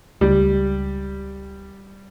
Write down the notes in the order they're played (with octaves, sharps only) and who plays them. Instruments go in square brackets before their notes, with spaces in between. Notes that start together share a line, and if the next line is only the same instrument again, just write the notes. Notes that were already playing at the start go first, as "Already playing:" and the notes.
[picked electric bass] C#2 [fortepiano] G3